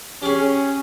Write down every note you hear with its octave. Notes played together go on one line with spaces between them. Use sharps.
C#4 G4 G#4